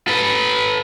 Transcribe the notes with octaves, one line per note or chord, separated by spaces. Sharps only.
A4 B4